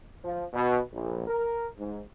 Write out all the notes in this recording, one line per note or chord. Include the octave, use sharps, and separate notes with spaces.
F3
B2
A#1
A#4
G#2